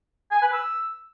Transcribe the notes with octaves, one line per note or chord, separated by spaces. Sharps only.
G#5
B4
E6